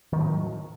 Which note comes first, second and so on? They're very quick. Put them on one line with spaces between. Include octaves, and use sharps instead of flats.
D#3 A2 A3 F#3